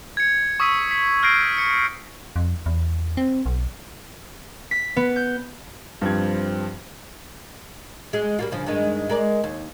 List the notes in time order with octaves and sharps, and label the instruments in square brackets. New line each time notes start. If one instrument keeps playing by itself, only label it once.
[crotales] G#6 C#7
C#6 D#6 E6 B6 D#7
B6
F6 G6 A#6 C7 D7
G#6 C#7
[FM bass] F2
E2
C4
B1
[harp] B6
B3
G6
[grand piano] G2 F3 G3 C4 G#6
[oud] G#3 G#4
G3 A#3 F4
G2 C#3 F3
G2 D#3 G#3
G#3 A#4 D5
D#2